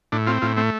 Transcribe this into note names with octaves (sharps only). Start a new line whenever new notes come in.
A2 D4
C4 F4
A2 F4
A3 C4